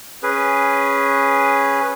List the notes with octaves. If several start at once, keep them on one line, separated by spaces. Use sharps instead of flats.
C#4 G#4 B4